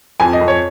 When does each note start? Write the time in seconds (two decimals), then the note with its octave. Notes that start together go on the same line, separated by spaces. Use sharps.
0.20 F2 G#5
0.33 D#5
0.41 F2
0.48 C#5